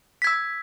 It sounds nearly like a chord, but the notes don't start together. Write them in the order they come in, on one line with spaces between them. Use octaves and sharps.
B6 G#6 E6